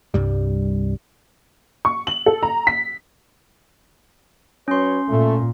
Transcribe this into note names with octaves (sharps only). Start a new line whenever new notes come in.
C2 G2 G3
C#6
F#7
A4
A#5
B6
F#3 C#4 B4 C#5 C6
A#2 A3